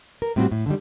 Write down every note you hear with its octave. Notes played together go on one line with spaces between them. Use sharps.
A#4
A2 G3 C4 D#4 F#4 G4
A2
D3 D#3 G3